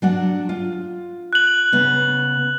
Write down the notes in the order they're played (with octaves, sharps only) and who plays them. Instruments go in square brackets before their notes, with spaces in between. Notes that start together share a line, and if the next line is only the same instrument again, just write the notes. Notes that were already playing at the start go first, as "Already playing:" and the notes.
[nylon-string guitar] F#3 D4 F#5
F4
[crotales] F#6 F#7
[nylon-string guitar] C#3 B3